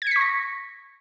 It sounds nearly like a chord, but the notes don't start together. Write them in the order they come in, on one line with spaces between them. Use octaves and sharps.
G#6 C#7 B6 C#6 A#6